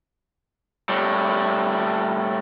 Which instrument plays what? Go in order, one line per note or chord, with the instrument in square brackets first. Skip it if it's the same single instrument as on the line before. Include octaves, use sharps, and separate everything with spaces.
[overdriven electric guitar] A2 G3